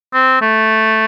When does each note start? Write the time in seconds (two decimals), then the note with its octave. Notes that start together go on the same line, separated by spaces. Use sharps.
0.14 C4
0.41 A3